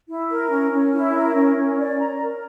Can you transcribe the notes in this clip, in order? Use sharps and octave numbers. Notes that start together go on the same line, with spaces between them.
E4
A#4
C#4
C#4
E4
A#4
C#4
C#4
D5
A#5
A#4